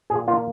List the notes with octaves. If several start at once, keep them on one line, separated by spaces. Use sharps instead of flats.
A#2 G#4
A#3 F4